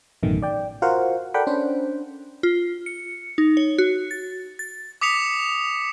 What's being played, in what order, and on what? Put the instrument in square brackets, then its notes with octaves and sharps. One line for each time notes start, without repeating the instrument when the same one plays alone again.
[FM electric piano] A1 F#2 B2 D#3 A3
D5 G5
F4 F#4 A#4 C5 F5 F#5
A4 A#4 D5 F#5 G5 B5
C#4 D4 C5
[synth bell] F4
C#7
D#4
C#5
F#4
A6
A6
[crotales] D6 D#6 B6 C#7 F7